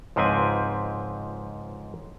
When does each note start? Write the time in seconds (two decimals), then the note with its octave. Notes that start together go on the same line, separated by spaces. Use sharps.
0.16 C#2 G#2 F3 C4 B4 G#5